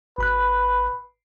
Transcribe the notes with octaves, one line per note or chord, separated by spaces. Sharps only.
G#1 B4 B5 F#6